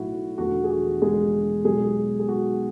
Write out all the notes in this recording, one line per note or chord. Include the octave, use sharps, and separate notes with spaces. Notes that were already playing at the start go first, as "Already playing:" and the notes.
Already playing: B1 A2 F#3 A3 E4 F#4
E1 E2 D3 F#3 A3 F#4
G#4
F#4
G#3 G#4
B1 B2 F#3 G#3 G#4
G#4
F#4